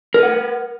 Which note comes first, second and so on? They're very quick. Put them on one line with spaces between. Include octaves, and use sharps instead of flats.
A#4 B4 F#5